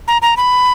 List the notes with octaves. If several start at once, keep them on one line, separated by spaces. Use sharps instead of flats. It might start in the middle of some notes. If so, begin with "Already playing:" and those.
A#5
A#5
B5